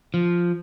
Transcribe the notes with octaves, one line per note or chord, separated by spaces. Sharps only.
F3